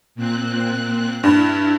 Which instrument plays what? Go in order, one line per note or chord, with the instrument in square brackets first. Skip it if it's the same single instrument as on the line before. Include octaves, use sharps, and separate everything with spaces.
[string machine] A#2 C4 F#6
[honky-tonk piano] G2 [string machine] E4